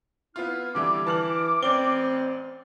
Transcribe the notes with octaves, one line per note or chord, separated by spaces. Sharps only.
B3 E4 F4 F6
D3 E3 G3 D6
E3 A5 F6 F#7
A1 C4 D5 G7